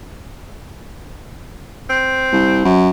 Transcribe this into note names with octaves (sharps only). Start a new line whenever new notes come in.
C4
C2
F#2